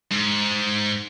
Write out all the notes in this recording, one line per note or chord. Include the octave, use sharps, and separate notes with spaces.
G#2